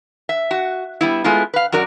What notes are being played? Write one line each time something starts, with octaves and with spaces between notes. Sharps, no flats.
E5
F#4
G3 B3 E4
G#3 A3 B3 E4 F4
B4 F5
F#2 F#4 A#4 D5